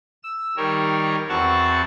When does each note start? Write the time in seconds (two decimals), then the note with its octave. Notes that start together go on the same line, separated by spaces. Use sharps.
0.23 E6
0.57 D#3 G3 A#4 C#5
1.29 E2 C4 F#4 F#5 A5 C#6